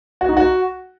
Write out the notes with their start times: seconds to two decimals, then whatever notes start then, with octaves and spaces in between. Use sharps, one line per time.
0.21 F#4
0.29 D#4
0.37 F#4